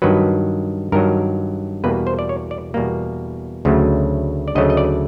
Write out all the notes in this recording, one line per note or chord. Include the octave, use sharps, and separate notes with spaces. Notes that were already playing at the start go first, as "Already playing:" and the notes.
G2 D#3 F#3 B4
G2 D#3 F#3 A#4
E2 B2 G3 A#3 B4
C5
D5
C#5
D5
E2 B2 G3 A#3
D2 C#3 F#3 A3
D5
D2 C#3 F#3 A3 D#5
D#5
D5